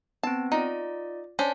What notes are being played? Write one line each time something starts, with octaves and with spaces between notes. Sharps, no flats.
B3 C4 A5
D#4 F4 D5
C#4 D4 C5